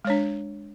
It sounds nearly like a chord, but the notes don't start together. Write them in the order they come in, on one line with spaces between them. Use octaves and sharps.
G#3 C#5 D4